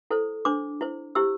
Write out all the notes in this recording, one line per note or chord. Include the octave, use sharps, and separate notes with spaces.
E4 A4 C5
D4 C5 D6
E4 C5
E4 G4 C5 E6